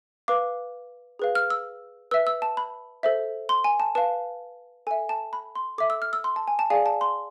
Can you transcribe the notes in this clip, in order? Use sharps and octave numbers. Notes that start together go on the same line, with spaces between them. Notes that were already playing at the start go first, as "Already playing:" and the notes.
B4 F5 D6
G#4 B4 F5
F6
E6
B4 E5 E6
E6
A5
B5
A4 C5 E5
C6
G#5
A5
B4 F5 A5
A4 E5 G#5
A5
B5
C6
A4 E5 D6
E6
F6
E6
C6
A5
G#5
A5
G#4 D5 F5 G#5
A5
C6